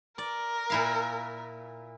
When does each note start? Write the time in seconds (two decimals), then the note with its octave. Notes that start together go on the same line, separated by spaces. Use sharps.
0.18 A#4 D5
0.70 A#2 E4 F5